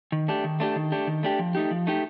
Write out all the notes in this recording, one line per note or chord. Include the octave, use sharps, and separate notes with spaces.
D#3
A3 D4 G4
D#3
A3 D4 G4
D#3
A3 D4 G4
D#3
A3 D4 G4
F3
A3 D#4 G4
F3
A3 D#4 G4